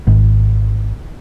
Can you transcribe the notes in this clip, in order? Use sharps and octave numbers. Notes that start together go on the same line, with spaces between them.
G#1